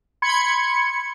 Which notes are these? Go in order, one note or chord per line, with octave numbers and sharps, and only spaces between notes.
B5 C6 G#6 C#7